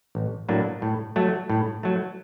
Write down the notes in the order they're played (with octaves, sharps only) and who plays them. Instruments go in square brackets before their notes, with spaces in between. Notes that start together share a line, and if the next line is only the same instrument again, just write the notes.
[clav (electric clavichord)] A1
A2 F#3 A#3 D4
A2
F#3 A3
A2
F#3 A3